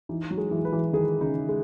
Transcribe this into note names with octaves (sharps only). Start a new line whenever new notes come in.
E3 D#4
F#3
G#3
E3
B4
E3
D#3 G#4
C#3 D#4
G#3